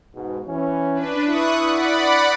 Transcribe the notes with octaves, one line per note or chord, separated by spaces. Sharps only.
G#2 B2
E3 C#4
D4 B4
E4 C#6 D#6 F#6
D5 F#5 B5